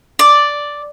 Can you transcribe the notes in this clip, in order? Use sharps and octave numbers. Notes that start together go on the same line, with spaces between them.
D5